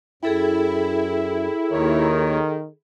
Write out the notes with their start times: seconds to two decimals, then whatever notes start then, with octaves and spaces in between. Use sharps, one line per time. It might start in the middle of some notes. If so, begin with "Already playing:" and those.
0.23 F#2 E4 G#4 A4 G5
1.71 D#2 D#3 A#4 C#5